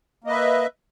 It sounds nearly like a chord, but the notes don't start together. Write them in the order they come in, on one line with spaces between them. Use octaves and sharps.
A#3 D#5 B4 E5